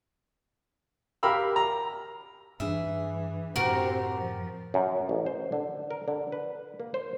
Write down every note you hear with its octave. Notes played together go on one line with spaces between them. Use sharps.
G4 A#4 F5 B5 E6
A#5
G2 E3 D4 G#4 E5
F#2 A2 C3 C4 F#4 G4 A#4 F#5
F3
F#2
A1
C5
D3
A#4
D3
B4
A#3
C5